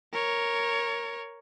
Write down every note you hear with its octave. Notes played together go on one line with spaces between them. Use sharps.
A#4 C#5